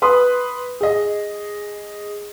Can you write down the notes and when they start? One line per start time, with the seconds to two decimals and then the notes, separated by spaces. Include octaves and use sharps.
0.02 B4 C6 D#6
0.81 G#4 D#5